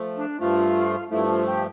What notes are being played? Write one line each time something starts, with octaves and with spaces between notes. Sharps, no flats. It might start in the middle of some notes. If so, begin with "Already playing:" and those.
Already playing: F3 A3
D4
G2 F3 A3 F4
G2 F3 A3 E4
F4
G4